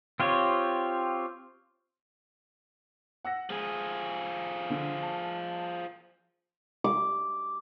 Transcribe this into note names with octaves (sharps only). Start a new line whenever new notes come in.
C4 F4 G4 C#5
F#5 E6 A#6
F3 G#3 G#4
D3
A5
D6